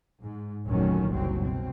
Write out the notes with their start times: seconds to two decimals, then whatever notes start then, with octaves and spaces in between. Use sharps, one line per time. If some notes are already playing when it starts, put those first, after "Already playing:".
0.24 G#2
0.67 F1 D2 A#2 D#3 F#3 C#4
1.10 F#1 C2 F#3 C4
1.40 B2 C4